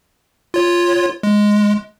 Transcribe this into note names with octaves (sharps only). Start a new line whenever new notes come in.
F4 C#5
G#3